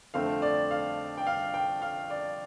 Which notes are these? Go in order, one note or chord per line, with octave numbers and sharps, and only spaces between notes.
F2 D3 A3 C4 F5
D5
F5
G5
F5
G5
F5
D5